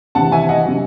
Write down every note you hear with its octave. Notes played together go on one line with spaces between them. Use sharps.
C3 E3 F#5 A5
E5 G#5
D#5 F#5
C3 F#3